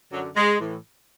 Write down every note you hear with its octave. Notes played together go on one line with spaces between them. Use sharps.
F#2 D3 F#3
G#3
A2 E3